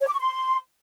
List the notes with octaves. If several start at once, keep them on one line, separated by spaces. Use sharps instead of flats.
C#5
D6
C#6
C6